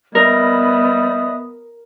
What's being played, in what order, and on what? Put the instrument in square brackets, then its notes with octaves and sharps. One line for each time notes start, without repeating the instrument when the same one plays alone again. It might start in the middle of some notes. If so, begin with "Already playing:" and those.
[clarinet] G3 [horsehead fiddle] B3 [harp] A#4 [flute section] D#5 E5 D#6